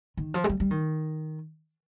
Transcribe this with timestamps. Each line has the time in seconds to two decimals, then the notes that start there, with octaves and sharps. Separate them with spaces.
0.17 D#3
0.34 F3
0.44 G#3
0.49 G3
0.60 G3
0.71 D#3